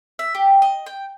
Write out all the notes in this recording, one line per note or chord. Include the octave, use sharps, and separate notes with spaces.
E5
G4
D#5
G5